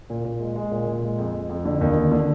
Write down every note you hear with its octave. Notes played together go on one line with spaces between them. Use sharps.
A#2
A#2
G#3
G#3
A#2
A#2
G#3
F2
F2
F2
D3
D#2
D3
D3